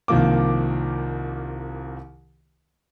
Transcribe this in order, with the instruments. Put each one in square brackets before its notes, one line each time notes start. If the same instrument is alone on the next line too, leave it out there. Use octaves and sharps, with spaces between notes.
[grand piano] C2 D#3 F3 A#3 D6